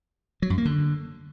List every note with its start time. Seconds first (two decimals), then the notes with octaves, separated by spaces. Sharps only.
0.42 F#3
0.50 F#2
0.58 A#3
0.65 D3